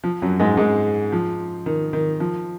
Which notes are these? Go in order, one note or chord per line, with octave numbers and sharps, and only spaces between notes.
F3
F#2 F#3
G#2 G#3
G#2 G#3
F3
D#3
D#3
F3